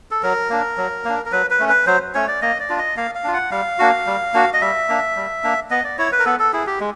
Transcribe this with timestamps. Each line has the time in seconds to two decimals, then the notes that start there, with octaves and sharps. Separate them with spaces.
0.11 A4
0.23 F#3 A#4
0.50 A#3 D4
0.77 F#3
1.05 A#3 D4
1.25 A#4
1.32 F#3 B4
1.50 B4
1.60 A3 C#4
1.69 B4
1.87 F#3 C5
2.14 A3 C#4 C#5
2.28 D5
2.42 A#3 D#5
2.60 D5
2.69 D4 F4
2.78 D#5
2.97 A#3 F5
3.15 F5
3.24 D4 F4
3.34 F#5
3.51 G3 F5
3.79 A#3 D4 F#4
4.06 G3
4.34 A#3 D4 F#4
4.53 D#5
4.61 G3 E5
4.89 A#3 D4
5.16 G3
5.43 A#3 D4
5.70 B3 D#5
5.84 D5
5.98 E4 C#5
6.12 B4
6.19 A#4
6.25 B3 A4
6.39 A4
6.53 E4 G#4
6.67 G4
6.80 G#3